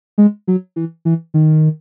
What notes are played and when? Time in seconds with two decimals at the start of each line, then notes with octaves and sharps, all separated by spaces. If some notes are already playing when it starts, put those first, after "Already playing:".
0.18 G#3
0.48 F#3
0.76 E3
1.05 E3
1.34 D#3